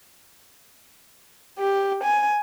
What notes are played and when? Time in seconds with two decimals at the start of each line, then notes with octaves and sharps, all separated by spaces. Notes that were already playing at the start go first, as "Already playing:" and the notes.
1.58 G4
2.02 G#5